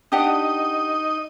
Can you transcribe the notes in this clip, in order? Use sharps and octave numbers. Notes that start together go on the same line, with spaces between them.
D4 D#4 G4 D#5 F#5